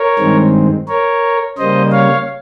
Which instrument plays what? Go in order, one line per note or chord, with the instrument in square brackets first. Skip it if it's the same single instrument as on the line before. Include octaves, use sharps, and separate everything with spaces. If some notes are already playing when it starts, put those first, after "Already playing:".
Already playing: [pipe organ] A#4 C#5
G2 D#3 G#3 C4
A#4 C#5
C#3 G3 A#3 C5 D#5
C#5 F5